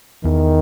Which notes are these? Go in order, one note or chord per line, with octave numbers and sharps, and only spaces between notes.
E2 D#3